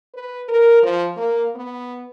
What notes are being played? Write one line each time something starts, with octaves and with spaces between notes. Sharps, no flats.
B4
A#4
F3
A#3
B3